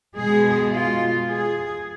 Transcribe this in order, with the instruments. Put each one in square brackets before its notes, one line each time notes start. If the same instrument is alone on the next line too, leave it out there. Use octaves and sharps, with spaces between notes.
[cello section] B2 G#3 G#4
F4
G#4